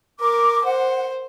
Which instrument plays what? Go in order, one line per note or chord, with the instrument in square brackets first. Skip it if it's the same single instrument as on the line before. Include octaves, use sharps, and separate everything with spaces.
[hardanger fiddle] A#4 [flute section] D6
[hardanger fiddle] C5 [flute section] F#5